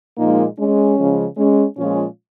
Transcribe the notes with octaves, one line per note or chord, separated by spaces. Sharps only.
A#2 F3 G#3 A#3 D#4
G#3 C#4
C#3 F3 G#3
G#3 C#4
A#2 F3 G#3 C#4 F4